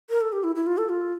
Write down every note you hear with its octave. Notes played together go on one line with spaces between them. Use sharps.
A#4
A4
G4
E4
E4
F4
A4
F4